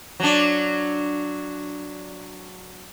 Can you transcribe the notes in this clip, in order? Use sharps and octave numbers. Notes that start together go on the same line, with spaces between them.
F#3 D4